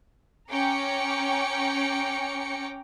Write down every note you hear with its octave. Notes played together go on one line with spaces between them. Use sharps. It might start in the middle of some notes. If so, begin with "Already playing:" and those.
C#4 G5 A#5 D6 C#7